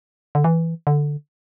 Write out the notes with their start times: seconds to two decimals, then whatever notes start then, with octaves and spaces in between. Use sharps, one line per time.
0.35 D3
0.44 E3
0.87 D3